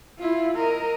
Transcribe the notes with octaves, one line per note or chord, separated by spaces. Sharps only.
E4 F4
A#4 D#5